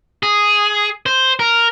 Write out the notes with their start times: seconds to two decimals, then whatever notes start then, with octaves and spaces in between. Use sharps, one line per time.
0.23 G#4
1.06 C5
1.39 A#4